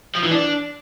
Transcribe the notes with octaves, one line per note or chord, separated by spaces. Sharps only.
F3
E3
D4